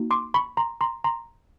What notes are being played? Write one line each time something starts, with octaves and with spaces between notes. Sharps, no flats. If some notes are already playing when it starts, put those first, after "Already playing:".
Already playing: A#3 D#4 F#4
C6 D6
B5 C#6
A#5 C6
A#5 C6
A#5 C6